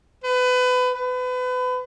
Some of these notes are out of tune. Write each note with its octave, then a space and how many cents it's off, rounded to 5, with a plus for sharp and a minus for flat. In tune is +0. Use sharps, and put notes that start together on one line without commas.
B4 +25
B4 +30